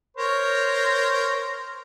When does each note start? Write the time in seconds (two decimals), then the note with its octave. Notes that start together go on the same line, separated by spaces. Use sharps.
0.17 A#4 C5 C#5